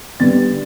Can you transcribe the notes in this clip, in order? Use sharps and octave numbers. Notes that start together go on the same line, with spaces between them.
D3 G3 B3 A6